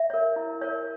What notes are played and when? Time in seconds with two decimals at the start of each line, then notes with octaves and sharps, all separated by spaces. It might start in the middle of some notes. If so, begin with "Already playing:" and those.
Already playing: E5
0.10 A#4 C#5
0.36 E4
0.62 A#4 C#5